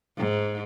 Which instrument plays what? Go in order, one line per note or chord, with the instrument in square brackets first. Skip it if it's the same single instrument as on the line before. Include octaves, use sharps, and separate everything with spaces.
[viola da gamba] G#2